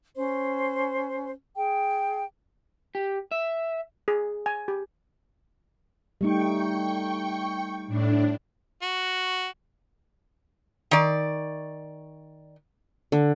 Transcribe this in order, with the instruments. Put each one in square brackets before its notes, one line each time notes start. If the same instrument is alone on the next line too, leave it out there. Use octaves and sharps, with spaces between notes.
[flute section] C#4 C5
G#4 G5
[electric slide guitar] G4
E5
[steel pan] G#4
G#5
G4
[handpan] G3 A3 D#4 [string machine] G5 C#6
[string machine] A2 D4
[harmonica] F#4
[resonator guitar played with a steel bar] D#3 D5
[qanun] D3